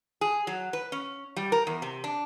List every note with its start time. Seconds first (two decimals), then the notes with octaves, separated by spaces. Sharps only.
0.21 G#4
0.47 F#3
0.73 B4
0.92 C#4
1.36 G3
1.52 A#4
1.67 E2
1.82 C3
2.04 D4